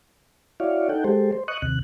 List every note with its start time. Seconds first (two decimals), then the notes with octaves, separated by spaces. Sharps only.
0.60 E4 F#4 C#5 D5 F5
0.89 D#4 A4 F#5 G5
1.04 G#3 G4 A4 C5
1.33 C5
1.48 D#5 C#6 D#6 F#6
1.62 D#2 C3 F#6